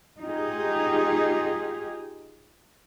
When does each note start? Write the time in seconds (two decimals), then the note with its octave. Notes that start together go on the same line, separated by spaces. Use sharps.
0.21 D#4 F4 G4 G#4